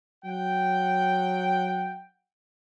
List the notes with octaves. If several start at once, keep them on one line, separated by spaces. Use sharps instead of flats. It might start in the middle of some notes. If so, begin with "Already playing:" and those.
F#3 F#5 G5